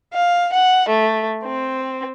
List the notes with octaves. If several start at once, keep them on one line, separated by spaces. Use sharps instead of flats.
F5
F#5
A3
C4